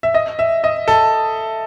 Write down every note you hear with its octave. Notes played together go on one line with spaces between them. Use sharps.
E5
D#5
E5
D#5
A4